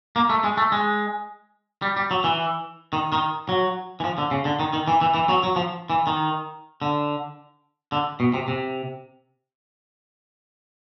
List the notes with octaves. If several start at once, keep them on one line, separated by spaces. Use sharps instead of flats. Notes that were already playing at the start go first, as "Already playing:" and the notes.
A#3
A3
G#3
A3
G#3
G3
G3
F#3
E3
D#3
D#3
F#3
E3
F3
D3
C#3
D3
D#3
D#3
E3
E3
E3
F#3
F#3
F3
E3
D#3
D3
D3
B2
C3
C3